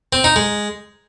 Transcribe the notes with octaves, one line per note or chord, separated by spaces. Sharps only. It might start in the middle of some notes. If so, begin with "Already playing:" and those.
C4
D#4
G#3